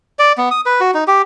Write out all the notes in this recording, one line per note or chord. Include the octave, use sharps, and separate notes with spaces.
D5
B3
D#6
B4
F#4
D#4
G4